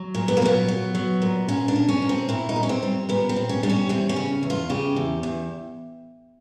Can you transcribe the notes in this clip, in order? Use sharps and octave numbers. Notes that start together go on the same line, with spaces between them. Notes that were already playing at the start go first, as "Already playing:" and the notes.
Already playing: F#3
A#2
B3
A#3
F#3 B3
F#3
F#3
A#2
A#2 C#4
D4
A#2
C#4
A#2
C4
A#2 E4
D#4
A#2
C#4
C4
G3
A#2 B3
C4
A#2
C#4
G3 D4
C#4
E2 C4
C#4
C#3
E2
F4
C#3 G4
E2
E2